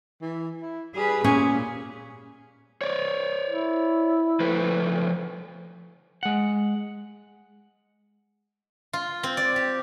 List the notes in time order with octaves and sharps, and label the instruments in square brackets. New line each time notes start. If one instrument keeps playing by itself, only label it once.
[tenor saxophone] E3
E4
[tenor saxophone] G3 [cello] G#4 B4
[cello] A#2 [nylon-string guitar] C#4 [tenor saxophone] G#4
[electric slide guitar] C#5 D5
[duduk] E4
[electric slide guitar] F3 A3 B4
[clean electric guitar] G#3 F#5
[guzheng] F4
C4
D5
G4